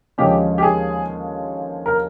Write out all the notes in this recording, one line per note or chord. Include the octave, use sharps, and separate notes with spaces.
D#2 D3 F3 G#3 C#4 G4
G4
G#4
A#4